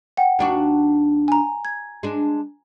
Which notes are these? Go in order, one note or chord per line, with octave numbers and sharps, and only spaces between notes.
F#5 G5
D#2 D4 F#4
G#5 A#5
G#6
G#3 D4